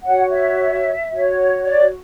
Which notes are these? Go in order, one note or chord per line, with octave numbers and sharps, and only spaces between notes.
F#4 C#5 F#5
E5
F#4 C#5
D5